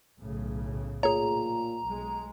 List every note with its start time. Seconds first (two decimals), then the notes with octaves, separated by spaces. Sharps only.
0.20 B1 A2 C#3
1.03 A#2 G#4 C#5 A#5
1.83 B1 G#3